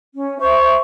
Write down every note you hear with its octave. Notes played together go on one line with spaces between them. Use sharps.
C#4
C5 E5 C#6